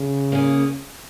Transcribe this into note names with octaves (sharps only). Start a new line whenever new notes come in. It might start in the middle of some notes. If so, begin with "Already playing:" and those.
Already playing: C#3
A#3 C#4 G#4